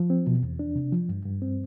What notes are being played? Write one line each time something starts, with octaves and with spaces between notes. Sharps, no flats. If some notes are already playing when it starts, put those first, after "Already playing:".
Already playing: F3
C4
B2
E2
D4
C3
F3
G2
G2
C4